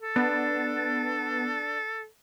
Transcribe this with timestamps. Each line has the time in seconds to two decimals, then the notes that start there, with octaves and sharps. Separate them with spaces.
0.02 A4
0.16 B3 D4